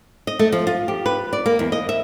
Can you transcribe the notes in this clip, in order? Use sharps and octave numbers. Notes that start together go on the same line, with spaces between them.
D#5
A3
F3
F4
G4
B4
D5
A#3
E2
D#5
E5